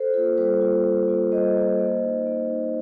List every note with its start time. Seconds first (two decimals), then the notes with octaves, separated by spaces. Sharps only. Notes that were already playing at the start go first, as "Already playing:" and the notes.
Already playing: A4 C5
0.14 A#3 F4 A4
0.37 G3 A4 C5
0.61 A#3 F4
0.85 G3
1.08 A#3 F4
1.32 G3 C5 D#5
1.56 A#3 F4
1.79 A#3
2.03 D#4
2.26 A#3
2.49 D#4